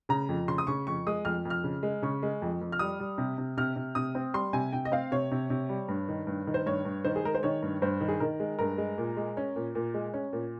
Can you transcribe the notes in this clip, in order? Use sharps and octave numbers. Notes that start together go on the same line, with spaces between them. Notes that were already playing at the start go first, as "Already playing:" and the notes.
C#3 A#5
F2
C#3 C6
D#6
C#3 C#6
F2 C#6
G#3 D#6
F2 F6
F2
F6
C#3
G#3
C#3 C#6
G#3
F2
F2
F6
G3 D#6
G3
C3
C3
C3 F6
C3
C3 D#6
C4
G3 C6
C3 G#5
C3 G5
D#5
C4 F5
C3 C#5
C3
C3
G3
G2
D#3
G2
D#3
C5
G2 C#5
G2
D#3 C5
G#4
G#3 A#4
C5
D#3 C#5
G2
G2 C5
D#3
G#4
D#3 A#4
G#3
G2 A#4
G#3
A#2
G#3
C#4
A#2
A#2
G#3
C#4
A#2